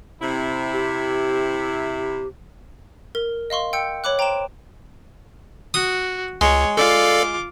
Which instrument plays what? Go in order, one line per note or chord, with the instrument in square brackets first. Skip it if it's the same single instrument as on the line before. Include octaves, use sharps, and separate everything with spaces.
[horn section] C3 E4
[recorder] G4
[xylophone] A#4
D#5 F5 C6 C#6
G5 E6 G6 C#7
C#5 B5 D6 F#6
C5 G5 A#5 C6 D7 E7
[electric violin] F#4 [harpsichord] D#6
[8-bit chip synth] C#2 [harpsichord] G#3 [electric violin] C#5
[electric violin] F4 D6 [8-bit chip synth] A4 D5 F5